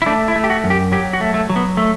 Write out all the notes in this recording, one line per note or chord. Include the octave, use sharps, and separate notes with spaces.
E4
A3 D4
E4
A3
G4
F#4
F#2
G4
F#3 G4
F#4
A3
A3
F#3
B3
A3